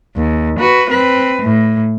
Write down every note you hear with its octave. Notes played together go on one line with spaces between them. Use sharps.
D#2
F#4 B4
C4 B4
A2